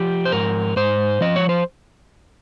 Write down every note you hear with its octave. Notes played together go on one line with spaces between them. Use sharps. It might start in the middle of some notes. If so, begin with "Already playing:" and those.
Already playing: F3 G4
C5
G#2 A#4
G#2 C5
F3 D#5
C#5
C5